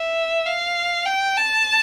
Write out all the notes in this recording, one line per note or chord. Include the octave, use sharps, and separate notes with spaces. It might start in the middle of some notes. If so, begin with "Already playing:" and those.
Already playing: E5
F5
G5
A5